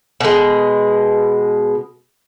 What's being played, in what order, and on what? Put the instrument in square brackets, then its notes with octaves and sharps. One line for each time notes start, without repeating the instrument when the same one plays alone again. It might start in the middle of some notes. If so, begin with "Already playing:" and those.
[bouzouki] B2 G#3